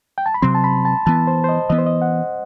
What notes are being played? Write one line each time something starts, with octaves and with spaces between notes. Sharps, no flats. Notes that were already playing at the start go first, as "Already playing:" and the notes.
G5
A5
B5
C3 F#3 C4 C6
A5
B5
A5
E3 B3 A5
C5
C5
D#5
E3 B3 D#5
C5
D#5
F#5